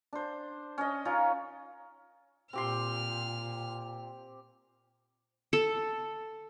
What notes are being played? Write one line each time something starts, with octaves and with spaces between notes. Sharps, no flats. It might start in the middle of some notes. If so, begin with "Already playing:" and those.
D4 C5
C#4 D#5
C#4 D#4 F4 A#4
A#2 C4 G4 C6 F6
A4